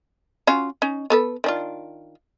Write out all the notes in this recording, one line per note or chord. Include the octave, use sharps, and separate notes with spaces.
C#4 F4 F#4
C#4 D#4
B3 A4 B4
D#3 D4 F4